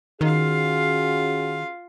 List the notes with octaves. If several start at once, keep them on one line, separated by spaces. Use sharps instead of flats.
D#3 C#4 F4 F#4 G#4 F5